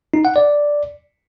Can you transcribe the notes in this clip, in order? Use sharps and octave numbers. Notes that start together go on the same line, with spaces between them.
D#4
F#5
D5